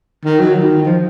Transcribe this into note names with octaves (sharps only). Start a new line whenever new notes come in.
D#3
F#3
D#3
F3